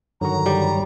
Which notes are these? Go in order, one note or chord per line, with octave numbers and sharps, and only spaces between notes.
G2 D3 D#3 F#3 F#4 C#5 A#5
G3